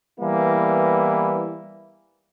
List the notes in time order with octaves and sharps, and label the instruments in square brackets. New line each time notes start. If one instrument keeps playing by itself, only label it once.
[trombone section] E3 G3 A#3 B3 E4